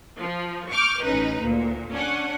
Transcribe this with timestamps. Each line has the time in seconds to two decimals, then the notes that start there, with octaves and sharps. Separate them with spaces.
0.19 F3
0.71 C#6 D6 F6 G6
1.01 A1 C#4 D#4 B4
1.40 D2 A#2
1.92 C#4 D4 F#5